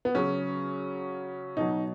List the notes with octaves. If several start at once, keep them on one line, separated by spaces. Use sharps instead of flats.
B3
C#3 F#3 C#4
B2 F#3 D#4